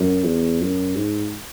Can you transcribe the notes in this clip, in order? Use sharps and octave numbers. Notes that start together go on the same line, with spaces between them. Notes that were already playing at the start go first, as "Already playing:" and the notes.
Already playing: F#2
E2
F#2
G#2